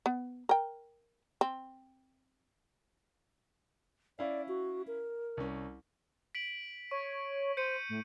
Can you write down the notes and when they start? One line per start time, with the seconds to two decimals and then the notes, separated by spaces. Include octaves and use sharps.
0.06 B3
0.49 A#4 G5
1.41 C4
4.19 C#4 E4 D5 F5
4.48 F#4
4.87 A#4
5.37 C2 C#4
6.35 B6 D7 F#7
6.91 C#5 C#6
7.57 C5 G6 C#7 D#7
7.89 A2